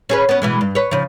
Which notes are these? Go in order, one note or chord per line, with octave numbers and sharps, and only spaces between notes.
C#4 G#4 B4
B3 C#4
B2 E3 G#3
G2
B4 C#5
C#3 F3